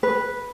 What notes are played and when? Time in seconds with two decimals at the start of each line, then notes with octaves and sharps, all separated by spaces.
0.03 B4